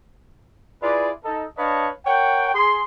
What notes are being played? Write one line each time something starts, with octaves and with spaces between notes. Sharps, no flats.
E4 F4 G#4 B4 D5
D#4 A4
D4 B4 C#5 D#5 F5 A5
A#4 C#5 F#5 G5
G#4 C6